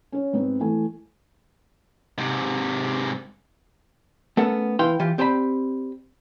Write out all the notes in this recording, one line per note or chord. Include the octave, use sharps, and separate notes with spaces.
C#4 C#5
G#2 B3 C4
E3 A3 G#5
G#2 C3
A3 B3 C#4 A4 A#4 F#5
E3 E4 B4 F5 G5 C6
E3 F4 G4
C4 G4 C5 D5 G5 B5